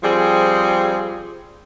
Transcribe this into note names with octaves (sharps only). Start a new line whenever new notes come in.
F3 G3 C4 G#4